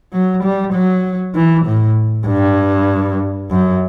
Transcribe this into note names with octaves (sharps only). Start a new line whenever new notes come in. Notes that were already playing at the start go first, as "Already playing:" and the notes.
F#3
G3
F#3
E3
A2
G2
F#2